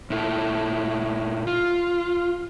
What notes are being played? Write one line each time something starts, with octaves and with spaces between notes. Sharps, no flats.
A#2 E4 A4
F4